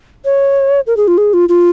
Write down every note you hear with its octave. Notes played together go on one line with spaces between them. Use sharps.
C#5
A#4
G#4
F4
G#4
F4
F4